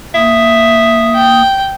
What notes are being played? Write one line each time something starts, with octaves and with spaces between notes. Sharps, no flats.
A#3 E5 D#6
G5